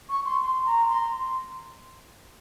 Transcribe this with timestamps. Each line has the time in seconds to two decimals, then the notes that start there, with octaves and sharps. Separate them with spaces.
0.09 C#6
0.25 C6
0.42 C6
0.66 A#5
0.90 C6